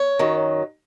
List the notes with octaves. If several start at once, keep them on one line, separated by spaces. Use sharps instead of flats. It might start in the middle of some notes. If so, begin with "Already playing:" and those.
Already playing: C#5
F#2 D#3 F#3